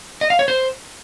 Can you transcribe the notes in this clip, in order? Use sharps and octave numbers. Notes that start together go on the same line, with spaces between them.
D#5
F5
C#5
C5